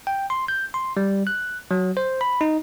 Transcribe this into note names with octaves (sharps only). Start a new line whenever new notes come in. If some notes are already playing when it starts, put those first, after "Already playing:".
G5
C6
G6
C6
G3
F#6
F#3
C5
B5
D#4